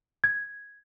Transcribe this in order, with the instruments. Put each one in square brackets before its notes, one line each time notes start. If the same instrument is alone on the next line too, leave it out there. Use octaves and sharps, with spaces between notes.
[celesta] G#6